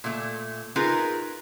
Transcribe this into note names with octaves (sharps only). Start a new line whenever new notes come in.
A#2 A3
D#4 F4 G#4 A#4 B4